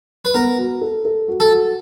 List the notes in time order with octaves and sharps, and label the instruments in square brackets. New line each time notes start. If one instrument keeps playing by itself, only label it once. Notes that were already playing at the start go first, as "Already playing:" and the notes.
[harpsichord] B4
[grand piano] B3 [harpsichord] A#4
[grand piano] F#4
A4
A4
F#4
[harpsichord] A4
[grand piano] F#4